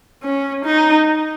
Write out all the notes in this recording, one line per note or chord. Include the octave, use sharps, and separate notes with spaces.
C#4
D#4